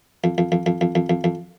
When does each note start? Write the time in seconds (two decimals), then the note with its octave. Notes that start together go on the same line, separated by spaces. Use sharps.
0.24 F2
0.38 F2
0.52 F2
0.66 F2
0.81 F2
0.95 F2
1.10 F2
1.24 F2